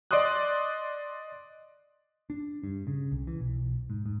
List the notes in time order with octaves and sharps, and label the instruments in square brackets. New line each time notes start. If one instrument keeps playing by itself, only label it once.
[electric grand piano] D5 D#5 C6 D6 D#6 F#6
[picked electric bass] D4
G2
C#3
C2
E3
B1
G#2
G#2